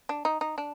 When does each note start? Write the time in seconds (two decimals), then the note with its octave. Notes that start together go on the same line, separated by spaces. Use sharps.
0.09 D4
0.25 D#4
0.41 D#4
0.58 D4